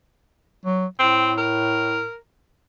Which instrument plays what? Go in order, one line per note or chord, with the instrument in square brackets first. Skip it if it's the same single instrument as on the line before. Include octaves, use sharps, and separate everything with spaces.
[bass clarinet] F#3
[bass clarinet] A2 [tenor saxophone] C4
[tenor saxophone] A#4